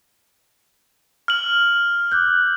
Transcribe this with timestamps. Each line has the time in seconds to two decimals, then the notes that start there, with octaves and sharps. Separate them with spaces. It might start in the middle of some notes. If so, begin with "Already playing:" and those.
1.28 F6 F#7
2.12 D6 F#6 G6